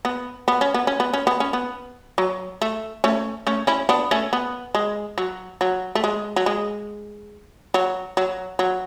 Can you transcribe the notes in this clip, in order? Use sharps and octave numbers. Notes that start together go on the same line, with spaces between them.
B3
B3
C#4
B3
C#4
B3
C#4
B3
C#4
B3
F#3
A3
A3 C#4
A3 C#4
C#4 E4
B3 D4
A3 C#4
B3
G#3
F#3
F#3
A3
G#3
F#3
G#3
F#3
F#3
F#3